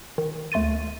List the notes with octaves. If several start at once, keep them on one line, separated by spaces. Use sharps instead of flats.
D#3
D2 A3 C6 A6 D#7